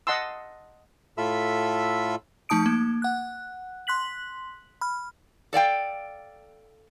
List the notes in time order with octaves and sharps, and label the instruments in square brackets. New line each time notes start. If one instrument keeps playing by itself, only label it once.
[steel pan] D#5 F#5 A5 C6 E6
[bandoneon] A2 F4 A4 E5 B5 E6
[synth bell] F3 A3 D#4 A5 D#6 D7
A#3
F#5 F#6
C6 F#6 B6 F#7
B5 F6
[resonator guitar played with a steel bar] A4 D5 F5 G5